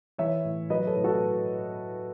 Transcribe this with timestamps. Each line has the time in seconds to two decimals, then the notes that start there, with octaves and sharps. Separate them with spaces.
0.18 E3 C#5 E5
0.44 A2
0.70 F#3 B4 D#5
0.87 A4 C#5
0.96 A2
1.04 F#4 A4